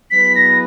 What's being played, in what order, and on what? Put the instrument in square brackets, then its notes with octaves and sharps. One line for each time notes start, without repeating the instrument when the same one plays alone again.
[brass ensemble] F#3 B3 E4 G#4 B4 [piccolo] B6
[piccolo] A#6